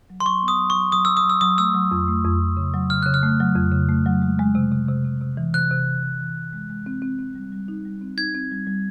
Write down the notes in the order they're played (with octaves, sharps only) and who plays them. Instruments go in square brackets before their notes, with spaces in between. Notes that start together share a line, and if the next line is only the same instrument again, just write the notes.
[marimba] F#3
[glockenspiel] C6
[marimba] F#3 [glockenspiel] C#6
[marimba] B3
[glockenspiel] D#6
[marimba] F#3
[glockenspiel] C#6
[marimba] F#3
[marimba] F#3 [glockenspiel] D#6
[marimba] F#3 [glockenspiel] E6
[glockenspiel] D#6
[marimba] F#3 [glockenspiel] E6
[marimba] F#3 [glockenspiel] D#6
[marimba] A3 [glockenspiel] E6
[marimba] F#3
F2
A3
F2
F2
C#3
F#3
[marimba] C#3 [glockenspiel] F6
[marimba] C#3 [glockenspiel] F#6
[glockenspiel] F6
[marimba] A3
F#3
F2
C#3
A3
F#3
G#3
G#3
C3
C3
C3
C3
C3
E3
[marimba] C3 [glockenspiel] F#6
[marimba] C3
E3
C3
E3
E3
G#3
G#3
C4
C4
C4
G3
G3
D#4
G3
C4
[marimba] D#4 [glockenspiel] G#6
[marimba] C4
G3
G3